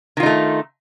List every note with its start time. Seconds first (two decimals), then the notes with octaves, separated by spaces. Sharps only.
0.17 D#3
0.20 F4
0.23 D#4
0.26 A3